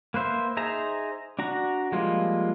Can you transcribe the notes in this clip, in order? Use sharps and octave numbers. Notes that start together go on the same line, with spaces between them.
A#3 B4 C5 E5
D#4 G#4 C5 E5 A#5
D4 F#4 A#5
F3 G3 G#3 A#3 F4